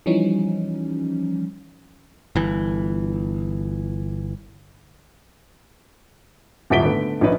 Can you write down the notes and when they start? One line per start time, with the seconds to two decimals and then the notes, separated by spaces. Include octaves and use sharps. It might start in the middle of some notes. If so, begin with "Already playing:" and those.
0.06 E3 F3 G3 C#4 D#4
2.36 G1 E3
6.70 D#1 G#1 E4 B6 D7 G7
6.84 D3 A3 B3
7.21 A#1 C#4 D#4 B4